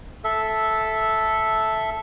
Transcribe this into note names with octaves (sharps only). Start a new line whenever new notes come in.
A4 E5